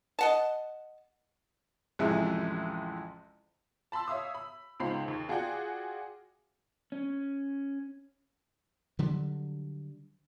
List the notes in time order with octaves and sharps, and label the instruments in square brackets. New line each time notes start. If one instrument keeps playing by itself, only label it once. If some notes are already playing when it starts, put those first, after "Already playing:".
[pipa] D#5 F#5 A5
[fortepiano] A1 F2 C3 E3 G#3
[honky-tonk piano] A5 B5 C6 E6
C#5 E5 F5 D#6
B5
C#2 G#2 F4 C5 B5 C7
D#2
F4 F#4 G#4 D5 F#5 G5
[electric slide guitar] C#4
[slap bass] D3 F#3 G3